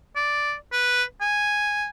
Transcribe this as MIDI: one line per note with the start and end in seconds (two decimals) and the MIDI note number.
0.16 0.54 74
0.73 1.04 71
1.21 1.88 80